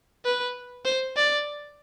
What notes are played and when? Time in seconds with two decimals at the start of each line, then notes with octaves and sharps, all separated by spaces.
0.25 B4
0.85 C5
1.16 D5